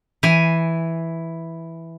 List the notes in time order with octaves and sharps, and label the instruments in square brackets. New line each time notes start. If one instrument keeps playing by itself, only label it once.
[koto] E3 G#5